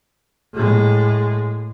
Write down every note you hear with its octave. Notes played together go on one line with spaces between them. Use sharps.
A2 G#3